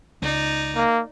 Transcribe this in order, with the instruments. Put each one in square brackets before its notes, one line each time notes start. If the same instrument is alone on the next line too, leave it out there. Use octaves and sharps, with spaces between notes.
[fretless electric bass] C#2 [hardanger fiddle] D#4 D5
[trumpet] A#3